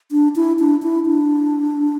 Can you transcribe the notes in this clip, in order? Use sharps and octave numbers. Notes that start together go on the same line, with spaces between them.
D4
E4
D4
E4
D4